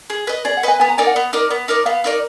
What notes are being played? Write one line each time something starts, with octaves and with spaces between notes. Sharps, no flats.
G#4
B4 D#5
G#4 D5
F#5
B4 D#5 G#5
B3 G#5
A#5
D#4 A#4 D5 G#5
F#5
B3
D#4 A#4 D5
B3
D#4 A#4 D5
B3 F5
D#4 A#4 D5